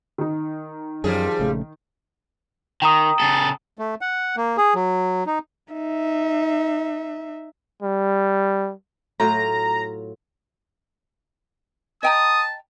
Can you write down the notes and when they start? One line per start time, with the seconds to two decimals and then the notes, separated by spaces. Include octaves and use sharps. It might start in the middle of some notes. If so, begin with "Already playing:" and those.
0.18 D#3 D#4
1.04 F#2 F3 G3 G#4
1.40 A#1 C#3 A3
2.82 D#3 G5 A#5 D#6
3.20 C#3 A4
3.79 A3
4.01 F#5
4.37 A#3
4.57 G#4
4.75 F#3
5.26 D#4
5.74 D#4 E5
7.82 G3
9.20 A2 F#3 F4 A#5
12.03 D#5 G5 A5 A#5 D#6